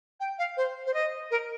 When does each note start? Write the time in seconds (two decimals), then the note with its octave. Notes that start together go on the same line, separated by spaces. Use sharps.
0.20 G5
0.39 F5
0.57 C5
0.86 C5
0.94 D#5
1.31 A#4